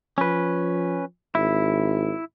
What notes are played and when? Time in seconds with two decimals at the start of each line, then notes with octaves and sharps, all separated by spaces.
0.18 F3 C#4 B4
1.35 G#1 E4